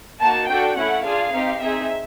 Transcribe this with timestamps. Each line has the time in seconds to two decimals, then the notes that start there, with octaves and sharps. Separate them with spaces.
0.20 A#3 D#4 F#4 A5
0.48 D4 F#4 A4 G5
0.76 A3 C#4 E4 F#5
1.04 D4 F4 G#4 F5
1.32 C4 D#4 G4
1.60 C4 D#4 G#4 E5